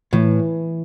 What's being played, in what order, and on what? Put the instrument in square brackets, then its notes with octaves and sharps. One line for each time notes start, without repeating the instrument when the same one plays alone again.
[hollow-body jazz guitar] A2 [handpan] E3